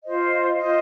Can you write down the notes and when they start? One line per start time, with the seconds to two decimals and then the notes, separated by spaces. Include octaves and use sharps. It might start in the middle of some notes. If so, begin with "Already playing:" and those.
0.04 F4 C5 D#5
0.59 F4 C5 D#5